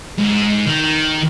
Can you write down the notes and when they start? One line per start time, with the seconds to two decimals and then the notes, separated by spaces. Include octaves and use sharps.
0.18 G#2
0.66 D#3